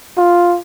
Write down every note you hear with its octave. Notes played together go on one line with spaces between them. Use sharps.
F4